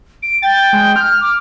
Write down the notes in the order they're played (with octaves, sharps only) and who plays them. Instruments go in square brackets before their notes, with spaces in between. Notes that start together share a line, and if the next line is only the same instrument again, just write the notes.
[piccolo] D7
[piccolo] G5 [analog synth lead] A6
[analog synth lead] G#3
[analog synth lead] F6 [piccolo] G6
[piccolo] D6